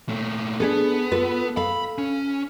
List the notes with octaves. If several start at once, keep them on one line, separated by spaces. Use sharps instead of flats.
A#2 A3
B3 D4 G#4 A4
F4 A4 B4
A4 F5 B5
C#4